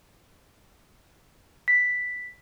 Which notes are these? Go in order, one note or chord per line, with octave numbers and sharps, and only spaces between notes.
B6